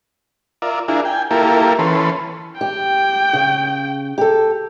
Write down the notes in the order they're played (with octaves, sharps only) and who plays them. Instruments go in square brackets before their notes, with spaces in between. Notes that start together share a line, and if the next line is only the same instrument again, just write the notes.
[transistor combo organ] F4 A#4 D5 E5
D4 E4 F4 G#4 A#4
G5 G#5
A#3 E4 F4 G4 A4 A#4
E3 C#4 A4 B4 C6
[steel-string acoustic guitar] G4 [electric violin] G5
[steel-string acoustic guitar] C#3
G4 A4